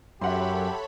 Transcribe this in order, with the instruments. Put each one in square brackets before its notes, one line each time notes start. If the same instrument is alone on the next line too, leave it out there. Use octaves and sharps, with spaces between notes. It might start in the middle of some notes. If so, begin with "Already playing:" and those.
[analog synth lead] F#2 [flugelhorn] G4 [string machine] A4 C#5 B5 [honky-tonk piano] E5 F#5 C6